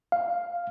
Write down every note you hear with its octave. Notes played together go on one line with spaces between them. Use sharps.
F5